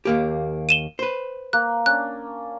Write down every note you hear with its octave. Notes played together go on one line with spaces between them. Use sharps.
D#2 A#3 G4
D#7 E7 G7
B4 C5
A#3 F#6
C#4 D4 F#6